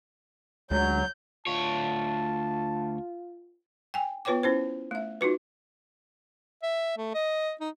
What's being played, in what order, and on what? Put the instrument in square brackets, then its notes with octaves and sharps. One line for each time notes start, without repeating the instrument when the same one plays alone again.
[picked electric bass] D2 D3 G#3 [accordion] F#3 [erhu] G6
[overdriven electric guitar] D2 C#5 [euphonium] F4 [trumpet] A5
[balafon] G5 G#5
B3 F4 B4 C#5 G5 D6
C#4 E4 C5
A3 E5
D#4 F4 F#4 B4
[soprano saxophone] E5
A3
D#5
D#4